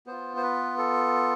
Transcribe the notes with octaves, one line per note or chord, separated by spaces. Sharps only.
B3 F4 C5
C5
B4
A4